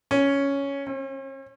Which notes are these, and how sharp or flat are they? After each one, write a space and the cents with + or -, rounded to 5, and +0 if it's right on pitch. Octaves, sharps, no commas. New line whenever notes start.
C#4 +5
C#4 -45